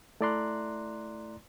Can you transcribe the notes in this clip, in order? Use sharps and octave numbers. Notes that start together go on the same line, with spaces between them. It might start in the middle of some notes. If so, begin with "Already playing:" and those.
A3 E4 D5 A#5 C6 F#6